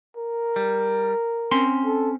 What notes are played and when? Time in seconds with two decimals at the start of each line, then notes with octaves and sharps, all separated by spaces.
0.17 A#4
0.56 G3
1.51 C4 C#4 C6
1.85 A4